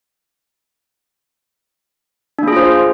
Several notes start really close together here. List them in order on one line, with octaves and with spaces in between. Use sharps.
D4 A#3 G#4 F4 C5